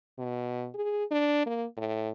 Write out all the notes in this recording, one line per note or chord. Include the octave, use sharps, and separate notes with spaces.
B2
G#4
D4
A#3
A2